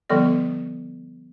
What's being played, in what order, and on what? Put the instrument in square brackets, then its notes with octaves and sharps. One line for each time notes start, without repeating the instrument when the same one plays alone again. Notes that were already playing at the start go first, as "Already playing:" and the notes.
[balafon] D3 F3 G3 B3 A4 D5